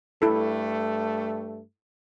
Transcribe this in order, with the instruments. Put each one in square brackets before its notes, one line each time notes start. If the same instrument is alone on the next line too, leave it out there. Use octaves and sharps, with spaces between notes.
[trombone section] G2 A3 [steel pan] E4 A4